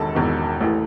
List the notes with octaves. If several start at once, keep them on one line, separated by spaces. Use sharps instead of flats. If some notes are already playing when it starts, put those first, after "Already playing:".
Already playing: E1 E2 D#3 A4 A5
E1 E2 D#3
A1 A2 E3